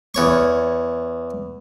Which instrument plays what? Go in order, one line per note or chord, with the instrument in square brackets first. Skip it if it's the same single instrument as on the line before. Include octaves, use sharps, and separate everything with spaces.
[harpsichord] E2 C#5 C#6